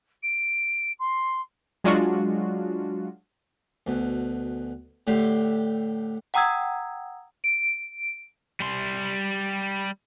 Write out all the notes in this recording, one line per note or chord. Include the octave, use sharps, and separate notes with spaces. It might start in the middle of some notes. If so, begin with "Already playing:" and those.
D7
C6
F#3 G#3 D4 F4 F#4
D2 B2
A2 D3 A3 G4 C6
F#5 G5 A#5 D#6 E6 G#6
D7
G3 C6